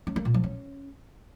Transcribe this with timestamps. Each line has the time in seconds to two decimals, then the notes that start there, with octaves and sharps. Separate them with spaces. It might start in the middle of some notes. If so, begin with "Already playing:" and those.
0.07 C#4
0.16 A#3
0.25 A#2
0.34 F3
0.44 C#4